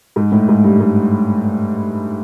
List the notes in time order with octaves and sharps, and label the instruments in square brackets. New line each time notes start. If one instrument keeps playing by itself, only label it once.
[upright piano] G#2
A2
G#2
G2
G#2